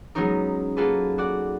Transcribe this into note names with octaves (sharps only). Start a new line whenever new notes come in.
F#3 G#3 B3 C#4 D#4 A#4
A#3 F4 F#4 G#4 A4 B4
F#4 D5 F#5